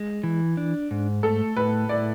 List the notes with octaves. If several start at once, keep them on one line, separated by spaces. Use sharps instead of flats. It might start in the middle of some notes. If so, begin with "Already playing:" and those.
Already playing: G#3
E3
D4
G#2
A3 A4
A2 B4
E4 D5